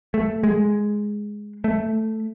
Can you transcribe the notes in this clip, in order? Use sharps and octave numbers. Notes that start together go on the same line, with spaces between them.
A3
G#3
A3